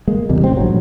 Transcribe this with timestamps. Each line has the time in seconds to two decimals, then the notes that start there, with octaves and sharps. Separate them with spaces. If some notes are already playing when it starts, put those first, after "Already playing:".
0.08 G#3 A#3
0.29 E2 C3 G3 G#3
0.41 A1 C4
0.56 A#1 G2 F#3